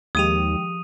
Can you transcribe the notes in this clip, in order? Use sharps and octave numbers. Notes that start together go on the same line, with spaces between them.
D#2 D#3 F3 G#3 G4 D#6 D#7 F7